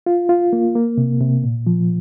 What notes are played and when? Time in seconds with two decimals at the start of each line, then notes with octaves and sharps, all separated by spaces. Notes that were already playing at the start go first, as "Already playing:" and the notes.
0.06 F4
0.29 F4
0.53 A#3
0.75 A#3
0.98 C3
1.21 C3
1.44 A#2
1.67 F3